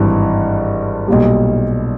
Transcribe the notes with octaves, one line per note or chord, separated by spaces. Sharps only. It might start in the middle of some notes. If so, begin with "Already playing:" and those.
Already playing: G#1 G2 E3 G3
B1 A#2 G3